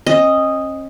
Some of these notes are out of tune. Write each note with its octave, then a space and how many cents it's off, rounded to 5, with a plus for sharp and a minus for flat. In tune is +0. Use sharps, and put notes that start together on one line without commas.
C#4 -45 D#5 +0